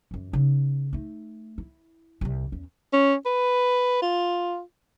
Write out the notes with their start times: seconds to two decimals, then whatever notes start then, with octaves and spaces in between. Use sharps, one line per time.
0.11 F#2 E3
0.33 C#3 D#4
0.93 A3 D#4
1.58 E4
2.21 D1 C2
2.52 E2 C#4
2.93 C#4
3.26 B4
4.02 F4